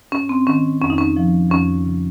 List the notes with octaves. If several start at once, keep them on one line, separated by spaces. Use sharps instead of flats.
G#2 C#4
C4
D#3 C#4
F2 C#4
D#4
C#4
C#3 F3
F2 C#4
C#3 F3